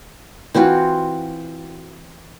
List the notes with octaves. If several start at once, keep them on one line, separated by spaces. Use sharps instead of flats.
E3 C4 F4 F#4